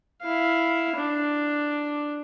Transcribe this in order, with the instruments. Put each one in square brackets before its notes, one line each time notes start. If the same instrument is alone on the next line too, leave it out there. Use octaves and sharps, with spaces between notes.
[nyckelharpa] E4 F5
D4